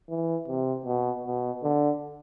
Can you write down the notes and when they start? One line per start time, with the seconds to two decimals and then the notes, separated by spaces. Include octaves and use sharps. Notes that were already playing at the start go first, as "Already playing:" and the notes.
0.09 E3
0.48 C3
0.85 B2
1.24 B2
1.63 D3